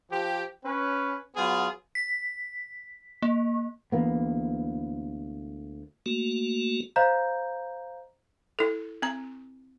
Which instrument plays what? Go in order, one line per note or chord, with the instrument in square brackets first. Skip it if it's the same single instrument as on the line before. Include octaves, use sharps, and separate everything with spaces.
[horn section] F3 G4
C#4 B4
F#3 B3 F4 G#4
[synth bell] B6
A#3
[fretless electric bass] D2 E3 A#3 B3
[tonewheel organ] A3 A#3 F#4
[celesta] C5 D#5 F5 A#5 G6
[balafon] E4 A4
C4 A#5